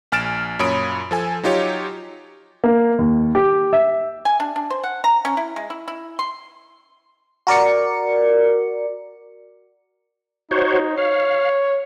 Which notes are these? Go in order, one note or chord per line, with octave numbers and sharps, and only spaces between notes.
A#1 G#5 F6 A6 D7 E7
F#2 A#2 C#5 B5 D#6 D7
F3 A4 G#5
F#3 D#4 F4 G4 C#5
A#3
D#2
G4
E5
G#5
D4
D4
C5
F#5
A#5
C#4
E4
G#3
E4
E4
C6
F#4 A#4 D5 C#7
D#4 F#4 C5 C#5
C#5 F5